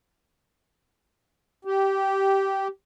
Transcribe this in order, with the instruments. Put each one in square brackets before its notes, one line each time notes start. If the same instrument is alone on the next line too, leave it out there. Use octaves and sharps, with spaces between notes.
[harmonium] G4